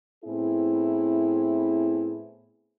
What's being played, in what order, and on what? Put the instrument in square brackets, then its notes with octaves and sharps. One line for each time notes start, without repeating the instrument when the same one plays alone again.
[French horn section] A2 B3 C4 E4 G#4